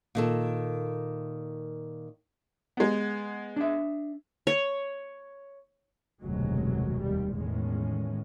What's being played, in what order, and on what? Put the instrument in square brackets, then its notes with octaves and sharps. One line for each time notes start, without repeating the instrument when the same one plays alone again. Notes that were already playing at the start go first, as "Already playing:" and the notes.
[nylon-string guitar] A#2 D#3 A4
[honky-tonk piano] G#3 B3
[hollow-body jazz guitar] D4 E5
[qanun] C#5
[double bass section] F1 D2 B2 D#3 F#3 G#3
D#2 D#3 G3
E2 A2 D#3 G#3 C#4